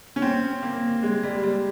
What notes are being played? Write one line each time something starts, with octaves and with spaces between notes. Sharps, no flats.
C#4
C4
A#3
G#3
G3
G3